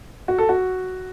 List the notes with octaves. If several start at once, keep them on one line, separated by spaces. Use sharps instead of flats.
F#4
A4
F#4